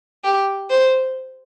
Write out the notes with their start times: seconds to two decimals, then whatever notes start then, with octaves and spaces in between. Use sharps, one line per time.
0.24 G4
0.70 C5